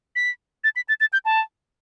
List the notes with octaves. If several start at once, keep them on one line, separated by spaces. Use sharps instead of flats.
B6
A6
B6
A6
A6
G6
A5